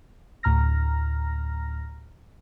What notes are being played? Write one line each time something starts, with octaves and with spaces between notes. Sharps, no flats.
D2 A2 A#5 F6 A#6